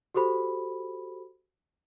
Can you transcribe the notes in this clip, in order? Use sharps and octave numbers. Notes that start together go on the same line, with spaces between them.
F#4 G4 A4 C5 B5